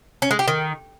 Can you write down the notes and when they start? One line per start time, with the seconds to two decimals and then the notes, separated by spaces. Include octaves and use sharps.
0.22 C#4
0.31 G#3
0.39 G4
0.48 D#3